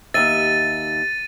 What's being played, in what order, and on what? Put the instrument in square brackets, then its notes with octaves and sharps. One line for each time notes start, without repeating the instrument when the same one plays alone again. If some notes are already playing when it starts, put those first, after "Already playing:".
[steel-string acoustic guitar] D#2 E5 [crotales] A6 D#7